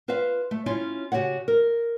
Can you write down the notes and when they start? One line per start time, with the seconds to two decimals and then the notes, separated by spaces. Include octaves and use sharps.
0.08 F4 B4 C5 E5 F5
0.51 A3
0.66 C#4 E4 F4 C#5
1.12 C#3 F#4 G4 C#5 F#5
1.48 A#4